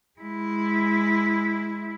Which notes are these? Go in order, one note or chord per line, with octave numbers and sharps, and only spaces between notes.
G#3 E4